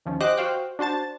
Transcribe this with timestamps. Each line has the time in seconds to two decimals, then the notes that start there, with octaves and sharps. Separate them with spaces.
0.06 D#2 F3 C#4
0.21 F#4 G4 C5 D#5 D6 F#6
0.37 F#4 C5 F5 G5
0.79 D4 F#4 C5 A5 A6